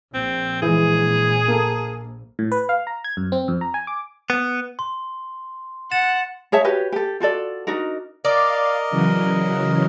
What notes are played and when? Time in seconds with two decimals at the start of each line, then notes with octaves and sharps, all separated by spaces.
0.14 A#1 C4
0.62 E3 G#3 G#4
1.48 A#3 A4
2.39 A2
2.52 B4
2.69 F5
2.87 A#5
3.04 G#6
3.17 F#2
3.32 C4
3.48 F2
3.61 A#5
3.74 G#5
3.87 D6
4.30 B3
4.79 C6
5.92 F#5 A6 E7
6.52 G#4 C#5 E5 A5
6.64 F#4 G4 B4 C#5
6.92 G4 A4
7.20 F4 F#4 A4 D5
7.67 D4 D#4 F#4 A#4
8.25 A#4 D5 D#5 F5
8.90 C#3 E3 F#3